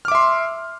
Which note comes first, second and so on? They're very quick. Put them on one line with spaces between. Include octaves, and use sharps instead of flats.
F6 D6 E5 C6